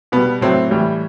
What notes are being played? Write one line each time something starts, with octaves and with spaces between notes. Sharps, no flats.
B2 G3 B3
A2 F#3 A3 C4
A2 E3 G3